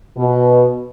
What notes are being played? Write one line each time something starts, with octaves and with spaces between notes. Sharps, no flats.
B2